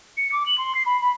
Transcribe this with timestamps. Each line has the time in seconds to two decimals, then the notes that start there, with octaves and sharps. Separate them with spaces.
0.17 C#7
0.32 D6
0.45 F#7
0.57 C6
0.74 C7
0.85 B5
1.00 B5